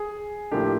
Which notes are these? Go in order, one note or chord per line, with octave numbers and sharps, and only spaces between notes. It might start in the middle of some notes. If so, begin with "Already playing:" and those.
Already playing: G#4
A2 F3 A#3 D4 G4